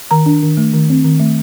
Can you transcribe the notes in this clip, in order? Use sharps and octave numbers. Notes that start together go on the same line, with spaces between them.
D#3 A#5
D4
D#3
A3
D#3
C4
D#3
A3